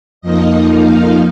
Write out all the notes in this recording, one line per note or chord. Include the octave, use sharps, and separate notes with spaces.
F2 F3 A#3 D#4 D#5
F5